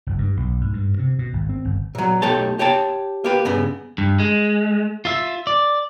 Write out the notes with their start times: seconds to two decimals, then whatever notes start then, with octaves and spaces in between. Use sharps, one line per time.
0.07 F#1
0.18 G2
0.37 B1
0.61 G#2
0.73 G2
0.99 C3
1.19 B2
1.33 G#1
1.49 C4
1.65 G1
1.95 A#2 F#3
2.22 B1 A3 G4 A4 C#5 A5
2.59 G4 C#5 G5 A5
3.24 A#3 G4 B4
3.45 G2 C#3 B3
3.98 G2
4.20 G#3
5.05 F4 E5
5.47 D5